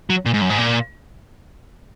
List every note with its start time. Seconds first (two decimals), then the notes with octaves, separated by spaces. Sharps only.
0.10 F#3
0.26 A#2
0.34 G#2
0.42 F#2
0.50 G#2
0.58 A#2